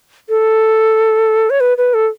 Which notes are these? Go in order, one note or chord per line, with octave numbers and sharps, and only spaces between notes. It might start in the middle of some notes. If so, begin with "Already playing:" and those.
A4
C#5
B4
B4
A4